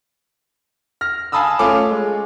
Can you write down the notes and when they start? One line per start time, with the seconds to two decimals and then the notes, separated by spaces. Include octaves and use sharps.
1.01 F6 A#6
1.32 F5 G#5 A5 B5 D#6 E6
1.59 A3 C#4 F4 D6
1.91 G#3